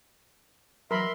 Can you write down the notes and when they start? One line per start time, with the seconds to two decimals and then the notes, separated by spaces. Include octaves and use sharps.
0.91 E3 F#3 A#4 E5 B5 C6